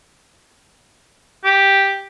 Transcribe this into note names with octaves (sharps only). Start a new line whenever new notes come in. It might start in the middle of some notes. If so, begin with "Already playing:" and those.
G4